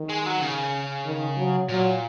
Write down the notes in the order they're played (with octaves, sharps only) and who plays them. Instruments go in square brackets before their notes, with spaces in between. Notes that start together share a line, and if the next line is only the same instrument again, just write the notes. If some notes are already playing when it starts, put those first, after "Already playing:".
Already playing: [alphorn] D#3
[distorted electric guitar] G#3
F#3
C#3
[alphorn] D#3
F#3
[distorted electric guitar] A#2 [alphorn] F#3